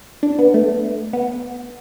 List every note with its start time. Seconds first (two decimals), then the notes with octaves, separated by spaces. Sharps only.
0.23 D4
0.39 B3
0.54 A3
1.13 B3